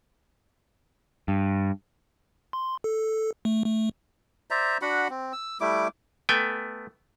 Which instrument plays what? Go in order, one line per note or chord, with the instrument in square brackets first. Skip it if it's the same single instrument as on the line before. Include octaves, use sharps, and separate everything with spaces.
[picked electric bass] G2
[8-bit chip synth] C6
A4
A3
A3
[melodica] C5 D5 E5 A#5
D4 F#4 F#5 B5
C4
E6
G3 A3 E4 D6
[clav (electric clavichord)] A3 B3 G5 G#5